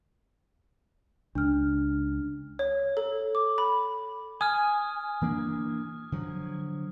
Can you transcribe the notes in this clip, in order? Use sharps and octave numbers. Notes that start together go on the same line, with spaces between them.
C#2 D4 F6
C#5
A4
D6
B5
G#5 D#6 F6
E3 A#3 D4
D3 F3 F#3